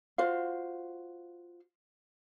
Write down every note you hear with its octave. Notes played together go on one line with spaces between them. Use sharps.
F4 F#4 C5 F5